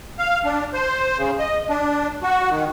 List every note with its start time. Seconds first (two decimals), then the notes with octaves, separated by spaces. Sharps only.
0.19 F5
0.45 D4
0.74 C5
1.18 C#3
1.39 D#5
1.69 D4
2.23 F#4
2.50 D#3